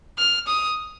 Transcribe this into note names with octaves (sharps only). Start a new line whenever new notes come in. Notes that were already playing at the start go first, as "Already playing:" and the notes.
F6
D#6